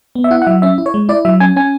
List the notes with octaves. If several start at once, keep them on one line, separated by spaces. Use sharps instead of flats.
B3
E5
E4 F#5
F#5
F#3 E5
C#4 E5
E4
C#5
G#3
E4 D5
F#3 E5
C#4 G#5
C#4 G#5